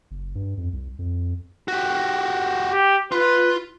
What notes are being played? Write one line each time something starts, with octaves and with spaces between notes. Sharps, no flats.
F#1
G2
F2
C2
F2
F#4 G4
G4
F4 B4 C6